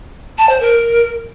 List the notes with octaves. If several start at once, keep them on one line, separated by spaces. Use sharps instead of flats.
A5
C5
A#4